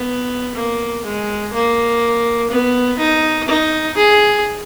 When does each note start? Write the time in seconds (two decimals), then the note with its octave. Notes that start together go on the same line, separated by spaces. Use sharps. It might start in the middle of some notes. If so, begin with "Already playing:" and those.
Already playing: B3
0.55 A#3
1.04 G#3
1.53 A#3
2.50 B3
2.98 D#4
3.48 D#4
3.97 G#4